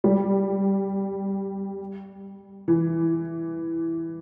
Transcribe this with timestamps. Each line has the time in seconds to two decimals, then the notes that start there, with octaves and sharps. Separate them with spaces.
0.04 G3
2.68 E3